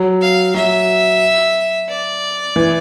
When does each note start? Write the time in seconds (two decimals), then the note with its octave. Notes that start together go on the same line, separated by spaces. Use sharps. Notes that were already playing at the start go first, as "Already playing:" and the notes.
Already playing: F#3
0.21 F5
0.55 F#3 E5
1.89 D5
2.56 E3